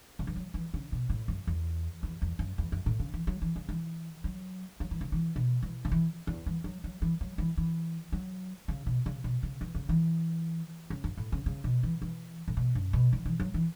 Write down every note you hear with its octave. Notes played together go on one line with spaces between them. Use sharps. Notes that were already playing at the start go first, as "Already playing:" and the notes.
C#3
E3
F#3
E3
C#3
B2
A2
F#2
E2
E2
E2
F#2
E2
F#2
A2
C#3
E3
F#3
E3
C#3
E3
F#3
F#3
E3
C#3
E3
B2
E3
C#3
E3
E2
E3
F#3
F#3
E3
F#3
E3
E3
F#3
C#3
B2
C#3
B2
C#3
E3
C#3
E3
C#3
F#2
A2
C#3
C#3
B2
E3
E3
A2
B2
F#2
B2
E3
E3
F#3
E3